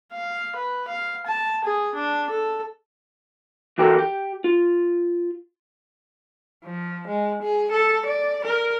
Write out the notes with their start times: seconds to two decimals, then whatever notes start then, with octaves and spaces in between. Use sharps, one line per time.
0.12 F5
0.55 B4
0.88 F5
1.26 A5
1.64 G#4
1.95 D4
2.30 A4
3.78 E3 F#4 G4 A4 A#4
3.99 G4
4.44 F4
6.63 F3
7.07 G#3
7.42 G#4
7.72 A4
8.06 D5
8.45 A#4